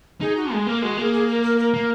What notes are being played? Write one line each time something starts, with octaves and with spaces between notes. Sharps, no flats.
D#4 G#4
F#4
G#3 G#4
A#3 A#4
G#3 F#4
A#3 G#4
G#4
A#4
A#4
A#4
A#3